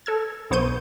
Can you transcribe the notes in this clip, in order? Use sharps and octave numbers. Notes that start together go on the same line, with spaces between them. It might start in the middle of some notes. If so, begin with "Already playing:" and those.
A4 E6 G#6
B1 B3 C5 C#6 G6 D#7